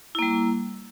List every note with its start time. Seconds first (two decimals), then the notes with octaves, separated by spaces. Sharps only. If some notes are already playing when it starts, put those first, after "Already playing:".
0.15 E4
0.19 A#3
0.22 G3